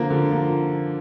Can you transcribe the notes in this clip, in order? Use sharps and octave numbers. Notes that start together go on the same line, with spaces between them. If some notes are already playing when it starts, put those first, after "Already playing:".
Already playing: D3 F3 A#3
D3
F3 A#3